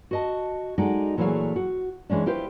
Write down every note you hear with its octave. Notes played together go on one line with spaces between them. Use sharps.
F#4 D#5 A5
G#3 D#4 F#4 A4 D5
A#2 E3 F#3 A3 G#4 F5
F#4
E3 G#3 C#4 D4
E4 F4 G4 B4 C5